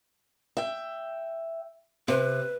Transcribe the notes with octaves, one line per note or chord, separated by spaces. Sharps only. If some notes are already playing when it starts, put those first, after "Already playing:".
E5 G5
C3 B4